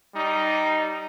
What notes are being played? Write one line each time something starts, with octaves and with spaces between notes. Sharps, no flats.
G3 D#4